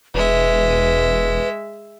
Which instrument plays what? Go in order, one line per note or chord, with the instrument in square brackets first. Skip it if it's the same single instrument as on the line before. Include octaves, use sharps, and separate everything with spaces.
[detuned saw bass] E1 [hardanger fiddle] G#3 E5 [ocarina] B4